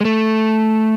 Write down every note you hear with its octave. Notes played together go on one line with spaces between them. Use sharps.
G#3
A3